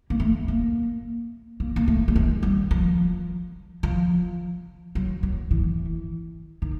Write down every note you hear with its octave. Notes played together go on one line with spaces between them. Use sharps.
A#3
A3
A#3
A#3
A#3
A3
G3
G#3
G3
F3
F3
F#3
F#3
E3
D#3